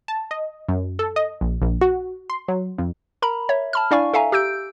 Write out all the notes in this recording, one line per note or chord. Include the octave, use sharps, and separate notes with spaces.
A5
D#5
F#2
A4
D#5
A#1
A#1
F#4
C6
F#3
F2
A#4 A#5 B5
C#5 E5
A5 B5 F6
D4 E4 D5 F5 G#5 C#6
A4 E5 F5 G#5 A#5
G4 E6 G6 D7